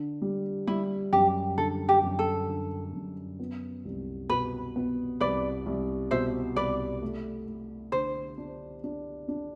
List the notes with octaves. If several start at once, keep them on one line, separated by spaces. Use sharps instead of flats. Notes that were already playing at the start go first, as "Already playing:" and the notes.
Already playing: D3
G3
G3 E4
F#2 G4
D3 A4
G4
F#2
A4
D3
F#2
B3
C2
B2 B4
B3
C2 B4 D5
C2
B2 C5 E5
C2 B4 D5
A3
A3
D3 C5
D4
D4
D4